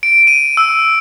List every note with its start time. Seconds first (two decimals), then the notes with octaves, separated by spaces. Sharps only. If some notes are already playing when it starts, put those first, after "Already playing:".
0.03 D7
0.27 D#7
0.57 E6